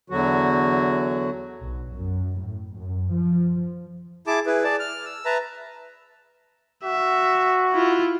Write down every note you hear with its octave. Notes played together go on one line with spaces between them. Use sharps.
E2 D3 F#3 F#4
B1
F#2
A2
F#2
F3
E4 G#4 A5 D6
E4 G#4 B4
G#4 D5 A5
F6
E6
B4 E5 A5 A#5
F#4 E5
E4 F4